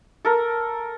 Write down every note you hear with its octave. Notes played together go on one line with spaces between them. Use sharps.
A4 A#4